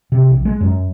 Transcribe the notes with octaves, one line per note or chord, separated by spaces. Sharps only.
C3
A#1
G#3
F#2